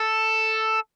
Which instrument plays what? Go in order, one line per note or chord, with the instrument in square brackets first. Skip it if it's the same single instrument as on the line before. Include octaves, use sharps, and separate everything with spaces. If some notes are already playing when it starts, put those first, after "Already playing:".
Already playing: [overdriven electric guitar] A4